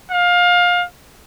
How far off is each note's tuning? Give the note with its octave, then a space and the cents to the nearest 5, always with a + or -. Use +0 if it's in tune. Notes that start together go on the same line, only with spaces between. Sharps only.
F5 +25